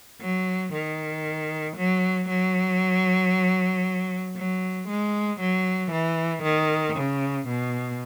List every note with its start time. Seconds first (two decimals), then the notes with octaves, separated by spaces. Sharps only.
0.21 F#3
0.73 D#3
1.77 F#3
2.29 F#3
4.37 F#3
4.88 G#3
5.40 F#3
5.91 E3
6.43 D#3
6.96 C#3
7.48 B2